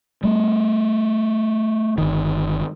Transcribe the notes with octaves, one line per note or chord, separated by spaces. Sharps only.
G3 A3
G1 D#3